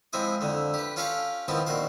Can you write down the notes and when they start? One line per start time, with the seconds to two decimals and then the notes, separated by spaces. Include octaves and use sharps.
0.13 F3 G#3 C4 E4 G#5 D#6
0.41 F2 D3 A3
0.74 G4 B4
0.96 C#4 F4 G4 A4 C#5 F5
1.48 D#3 F3 B3 C4 E4 F4
1.66 A#1 D#3 F#4 C6 D6